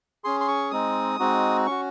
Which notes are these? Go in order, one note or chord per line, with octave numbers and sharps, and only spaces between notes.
C#4 G#4 C6
C6
C#6
G#3 C4 D#4 D#6
G#3 C4 D#4 F#4
C#4 F#4 C#6